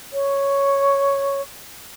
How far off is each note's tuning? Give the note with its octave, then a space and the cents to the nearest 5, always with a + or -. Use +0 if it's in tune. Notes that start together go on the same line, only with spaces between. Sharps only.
C#5 +0